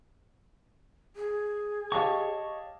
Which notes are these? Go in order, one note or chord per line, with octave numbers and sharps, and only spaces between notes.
G#4
G4 C#5 D#5 F5 A5 C#6